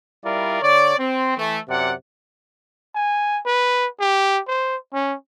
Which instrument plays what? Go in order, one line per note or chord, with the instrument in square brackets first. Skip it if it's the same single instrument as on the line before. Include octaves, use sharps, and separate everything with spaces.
[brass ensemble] G3 E4 F4 A#4 D5
D3 C#5 D5
C4
E3 A3
F#2 C3 D5 F#5
[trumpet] G#5
B4
G4
C5
C#4